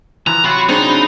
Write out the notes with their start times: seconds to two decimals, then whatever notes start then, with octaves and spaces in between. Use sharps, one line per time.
0.27 E3 F3 A#5
0.44 C3 F#3 F4 F#4 B5
0.69 C4 D4 D#4 G#4